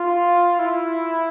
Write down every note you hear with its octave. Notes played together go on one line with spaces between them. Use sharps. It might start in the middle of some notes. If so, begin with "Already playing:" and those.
Already playing: F4
E4